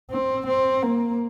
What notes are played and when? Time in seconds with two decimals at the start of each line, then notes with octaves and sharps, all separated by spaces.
0.11 C4
0.47 C4
0.82 A#3